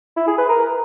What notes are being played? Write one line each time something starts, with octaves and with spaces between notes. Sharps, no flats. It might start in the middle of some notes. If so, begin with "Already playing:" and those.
E4
G#4
B4
A#4